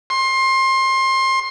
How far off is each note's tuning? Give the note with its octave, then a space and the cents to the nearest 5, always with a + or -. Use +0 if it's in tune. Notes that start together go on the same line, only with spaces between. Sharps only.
C6 +25